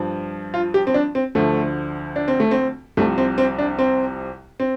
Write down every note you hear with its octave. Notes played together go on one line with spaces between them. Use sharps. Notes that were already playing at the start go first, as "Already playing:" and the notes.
Already playing: G2 F3
F4
G4
C4
D4
C4
D2 D3 F3 A3
D4
C4
A3
C4
C2 C3 F3 A3
C4
C4
D4
C4
C4